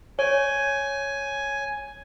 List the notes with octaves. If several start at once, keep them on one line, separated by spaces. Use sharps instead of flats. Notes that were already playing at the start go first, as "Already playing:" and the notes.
C#5 G#5